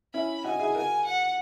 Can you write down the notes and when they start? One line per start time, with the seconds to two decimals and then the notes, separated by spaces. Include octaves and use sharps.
0.13 C#4 E4 B5
0.44 D#4 F#4 G#5
0.59 E4 G#4
0.75 F#4 A#4 G#5
1.05 F#5